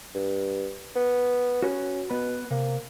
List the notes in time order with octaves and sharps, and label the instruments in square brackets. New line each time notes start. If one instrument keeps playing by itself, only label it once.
[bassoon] G2
B3
[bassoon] C#4 [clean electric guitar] F#4 B4
[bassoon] B2 [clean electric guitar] B3 B5
[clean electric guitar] C3 [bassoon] A#3